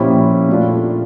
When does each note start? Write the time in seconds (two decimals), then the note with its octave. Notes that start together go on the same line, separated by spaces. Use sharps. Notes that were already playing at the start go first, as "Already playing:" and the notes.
Already playing: A#2 F3 C#4 E4 G4
0.49 A#2 A3 D4 F4